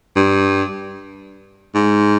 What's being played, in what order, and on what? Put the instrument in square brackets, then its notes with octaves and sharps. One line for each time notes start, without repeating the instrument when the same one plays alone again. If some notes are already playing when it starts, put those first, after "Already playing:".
[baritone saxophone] G2
G#2